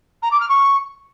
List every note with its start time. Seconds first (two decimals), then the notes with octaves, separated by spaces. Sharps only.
0.22 A#5
0.31 D6
0.40 F6
0.49 C#6